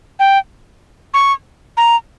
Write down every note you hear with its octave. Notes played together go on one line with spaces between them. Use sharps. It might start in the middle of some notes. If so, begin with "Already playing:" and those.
G5
C#6
A#5